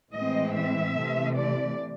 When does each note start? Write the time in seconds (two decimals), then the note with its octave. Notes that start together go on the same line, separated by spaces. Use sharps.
0.12 A2 E3 G#3 C4 D#5
0.53 E5
0.94 C3 E3 A3
1.35 D5